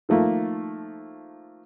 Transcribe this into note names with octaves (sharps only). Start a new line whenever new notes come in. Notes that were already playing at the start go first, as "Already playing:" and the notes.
D#3 F3 A3 A#3